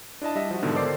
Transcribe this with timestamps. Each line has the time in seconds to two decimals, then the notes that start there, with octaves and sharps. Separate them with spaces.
0.22 D4 E4 D#5 A5
0.35 G3 D#5 E5
0.51 F3 F#4
0.62 G#2 B2 D3 D#3
0.75 D#3 A4 C5 D5 D6 C7